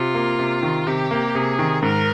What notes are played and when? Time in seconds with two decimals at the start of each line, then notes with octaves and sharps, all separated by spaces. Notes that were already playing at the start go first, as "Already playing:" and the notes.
Already playing: C3 F4
0.15 A#3
0.39 C3
0.63 D#3
0.87 C3 G4
1.11 A#3
1.35 C3 G#4
1.59 D#3
1.82 G#2 A#4